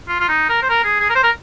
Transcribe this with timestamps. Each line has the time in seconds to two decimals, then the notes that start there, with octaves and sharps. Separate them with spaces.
0.08 F4
0.20 F4
0.29 D#4
0.49 A#4
0.63 C5
0.69 A#4
0.84 G#4
1.00 G#4
1.09 A#4
1.15 C5
1.23 A#4